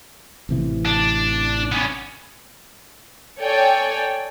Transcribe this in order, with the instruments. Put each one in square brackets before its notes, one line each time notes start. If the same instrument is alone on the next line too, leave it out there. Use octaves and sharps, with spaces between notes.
[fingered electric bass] A1 C3 E3
[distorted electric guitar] D4
B3 C#4
[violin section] A4 C#5 D5 G5 G#5